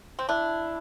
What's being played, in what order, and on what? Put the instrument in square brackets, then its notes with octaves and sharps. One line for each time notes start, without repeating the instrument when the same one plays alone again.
[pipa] C4
[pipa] D4 [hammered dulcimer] E4